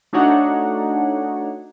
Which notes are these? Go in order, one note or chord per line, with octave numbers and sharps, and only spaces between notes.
A3 D4 D#4 F#4 C#5 F#5